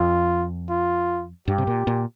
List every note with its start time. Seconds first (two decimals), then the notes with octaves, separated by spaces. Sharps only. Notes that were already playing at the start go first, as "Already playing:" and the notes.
Already playing: F2 F4
0.69 F4
1.48 G2 G4
1.58 C3
1.67 A#2
1.87 A#2